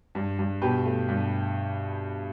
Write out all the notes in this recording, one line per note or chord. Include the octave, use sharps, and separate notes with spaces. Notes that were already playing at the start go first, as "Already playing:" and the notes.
G2
G2
B2 G4 B4
A3
G2